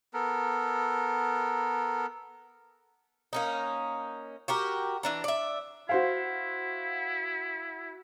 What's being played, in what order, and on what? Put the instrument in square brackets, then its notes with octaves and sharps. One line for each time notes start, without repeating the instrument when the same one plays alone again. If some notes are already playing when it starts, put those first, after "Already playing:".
[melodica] B3 A4 A#4
[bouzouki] A#3 C#4 D#4
F#4 G4 A#4
E3 D4 A#5
D5 E5
[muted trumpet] E4 [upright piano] F#4 C5 F5